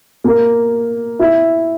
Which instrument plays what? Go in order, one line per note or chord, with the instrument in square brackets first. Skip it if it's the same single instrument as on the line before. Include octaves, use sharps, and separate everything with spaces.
[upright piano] A#3
E4